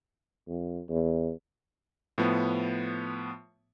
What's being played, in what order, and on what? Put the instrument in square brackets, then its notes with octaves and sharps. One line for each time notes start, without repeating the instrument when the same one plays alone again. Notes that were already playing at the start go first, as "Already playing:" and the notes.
[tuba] F2
E2
[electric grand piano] A2 F3 B3